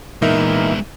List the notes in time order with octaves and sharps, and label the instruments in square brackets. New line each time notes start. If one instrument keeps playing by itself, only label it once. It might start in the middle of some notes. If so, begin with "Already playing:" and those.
[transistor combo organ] A#2 E3 [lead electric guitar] G#3 B3 [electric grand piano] D#4 A#4 E5